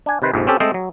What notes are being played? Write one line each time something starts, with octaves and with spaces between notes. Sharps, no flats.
D4 G#5
C3 D#3 B4 C5
A#1 F2 G#2 C3
C4 C#4 G4 A4
G#3 A3 C4 A4 C5 D#5
F#3